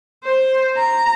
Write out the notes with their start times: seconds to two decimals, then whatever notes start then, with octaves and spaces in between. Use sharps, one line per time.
0.24 C5
0.77 A#5